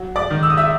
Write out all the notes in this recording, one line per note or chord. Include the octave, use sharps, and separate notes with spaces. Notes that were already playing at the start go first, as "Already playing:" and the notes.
Already playing: F#3
D5 D6
D#3
E6
D#6
E5 E6